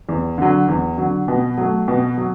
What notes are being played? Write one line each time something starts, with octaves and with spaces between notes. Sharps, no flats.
E2
D3 F#3
E2
D3 F#3
B2
F#3 A3
B2
F#3